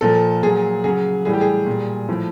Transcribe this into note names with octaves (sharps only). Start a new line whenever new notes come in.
A#2 F3 A4
A#2 F#3 G#4
C#3 F#3 G#4
A2 E3 G3 G#4
G4
G#4
A#2 G3
A2 F3